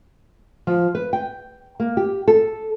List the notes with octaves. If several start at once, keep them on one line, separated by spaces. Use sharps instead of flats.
F3
B4
G5
A#3
G4
A4